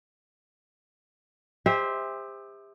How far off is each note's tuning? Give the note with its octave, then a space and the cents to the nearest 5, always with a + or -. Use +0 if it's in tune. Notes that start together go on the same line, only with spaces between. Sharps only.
G4 +40 C5 +0 E5 -20